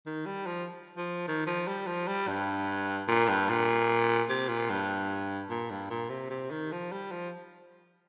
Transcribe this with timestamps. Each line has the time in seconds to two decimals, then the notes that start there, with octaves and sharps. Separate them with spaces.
0.06 D#3
0.26 G3
0.46 F3
0.96 F3
1.28 D#3
1.47 F3
1.67 G3
1.87 F3
2.07 G3
2.28 G2
3.08 A#2
3.28 G2
3.49 A#2
4.29 C3
4.49 A#2
4.70 G2
5.50 A#2
5.70 G2
5.90 A#2
6.10 C3
6.30 C3
6.51 D#3
6.72 F3
6.92 G3
7.11 F3